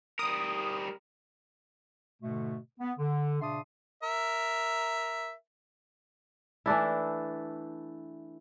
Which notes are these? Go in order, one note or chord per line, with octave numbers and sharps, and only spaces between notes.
G3 A#4 D#6
G#2 B2 D3 A3
B3
D3
A#2 C#3 D4 E5 C6 D#6
A#4 E5
E3 A3 D4 E4